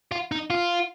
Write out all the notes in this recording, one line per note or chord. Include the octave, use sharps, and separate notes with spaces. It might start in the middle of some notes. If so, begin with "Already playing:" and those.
F4
D#4
F4